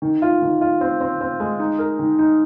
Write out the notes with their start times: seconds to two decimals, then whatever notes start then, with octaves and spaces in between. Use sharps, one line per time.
0.02 D#3
0.22 F4
0.42 D#3
0.61 F4
0.81 C4
1.01 C4
1.21 C4
1.40 G#3
1.59 D#4
1.79 A#4
1.99 D#3
2.19 D#4